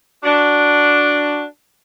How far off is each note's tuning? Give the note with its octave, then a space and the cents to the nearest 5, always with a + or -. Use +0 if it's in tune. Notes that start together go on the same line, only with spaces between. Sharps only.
D4 +0 F#4 +0